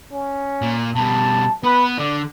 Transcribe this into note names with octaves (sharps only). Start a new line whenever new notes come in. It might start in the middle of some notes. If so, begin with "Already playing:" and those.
C#4
A#2
B2 G3 A5
B3 B4
D3 D5